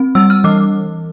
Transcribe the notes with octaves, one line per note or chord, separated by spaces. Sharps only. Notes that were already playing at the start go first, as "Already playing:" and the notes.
Already playing: C4
G3 E6
F6
E3 D6